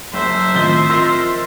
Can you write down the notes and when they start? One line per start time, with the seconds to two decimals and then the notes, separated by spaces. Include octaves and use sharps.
0.13 F#1 F#2 C5 E5
0.54 A2 D#3 F3 C4 D#5 G7
0.90 F4 A#4 D#5 C6 E6 A#6